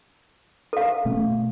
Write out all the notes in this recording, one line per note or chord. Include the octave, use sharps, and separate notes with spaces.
A4 F5
B2 A3 C#4